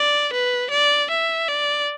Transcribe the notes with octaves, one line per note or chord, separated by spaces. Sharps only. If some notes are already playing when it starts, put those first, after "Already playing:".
Already playing: D5
B4
D5
E5
D5